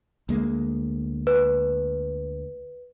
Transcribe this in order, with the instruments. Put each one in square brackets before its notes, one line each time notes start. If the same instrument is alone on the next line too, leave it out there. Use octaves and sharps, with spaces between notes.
[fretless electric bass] D2 G#3 A#3
[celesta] B4